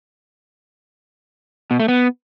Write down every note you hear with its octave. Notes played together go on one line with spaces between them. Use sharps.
B2
A3
B3